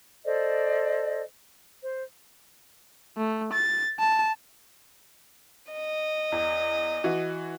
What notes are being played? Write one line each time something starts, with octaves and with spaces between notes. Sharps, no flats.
A4 C5 D5 D#5
C5
A3
A6
A5
D#5
E2
E3 F#4